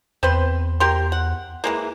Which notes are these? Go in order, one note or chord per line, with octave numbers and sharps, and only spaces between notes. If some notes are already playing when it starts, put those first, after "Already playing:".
E2 C4 B4 C6
G4 A#4 C6
F#5
E3 G#3 A#3